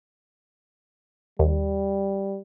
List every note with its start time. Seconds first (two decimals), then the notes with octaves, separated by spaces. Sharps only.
1.39 D#2 G3